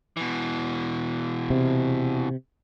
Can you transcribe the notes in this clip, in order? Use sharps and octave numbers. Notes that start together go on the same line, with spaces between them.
B2 E3
C3